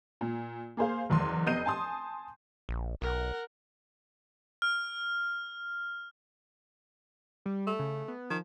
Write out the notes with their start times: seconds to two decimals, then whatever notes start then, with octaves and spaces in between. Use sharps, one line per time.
0.21 A#2
0.77 A#3 G#4 C5 F5
1.10 F#1 E2 C6
1.46 F1 B3 D#5 G6 C7 D#7
1.66 G#5 A5 C6 D#6
2.69 A#1
3.02 B1 A#4 F#5
4.62 F6
7.46 G3
7.67 A3
7.79 C#3
8.08 B3
8.30 D#3 F3